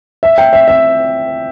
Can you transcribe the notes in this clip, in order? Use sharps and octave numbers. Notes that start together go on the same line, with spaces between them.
E5
G5
E5
E5